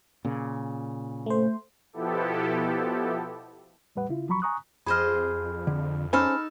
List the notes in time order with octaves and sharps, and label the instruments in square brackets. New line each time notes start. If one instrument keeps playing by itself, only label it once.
[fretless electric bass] A#2 C#3
[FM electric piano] A3 C5
[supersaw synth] B2 F3 B3 E4 G4 A4
[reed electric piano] E2 A2 G3 B4 F#5
C#3 E4 F4
E2 F3 F#3 A#5 B5 C#6
G#5 A#5 C#6 D#6 F#6
[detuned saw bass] F2 [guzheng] G#4 C5 D#5 [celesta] B5 F6
[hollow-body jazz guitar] D3
[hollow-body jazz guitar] C#4 C5 G#5 [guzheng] D#4 A4 [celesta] B5 F6